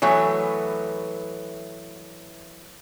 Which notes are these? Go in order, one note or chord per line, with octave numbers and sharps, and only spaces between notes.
E3 F#3 A3 B3